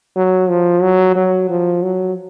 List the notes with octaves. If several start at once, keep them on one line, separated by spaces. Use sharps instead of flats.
F#3
F3
F#3
F#3
F3
F#3